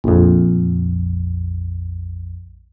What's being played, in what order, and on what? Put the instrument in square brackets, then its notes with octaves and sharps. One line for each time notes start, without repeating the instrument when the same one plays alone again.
[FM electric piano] A#1 F2